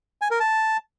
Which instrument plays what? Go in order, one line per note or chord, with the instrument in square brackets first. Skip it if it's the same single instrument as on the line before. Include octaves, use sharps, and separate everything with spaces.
[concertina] G#5
A#4
A5